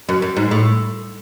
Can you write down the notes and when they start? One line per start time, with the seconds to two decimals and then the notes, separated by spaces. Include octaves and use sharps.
0.09 F#2
0.22 F#2
0.36 G#2
0.51 A2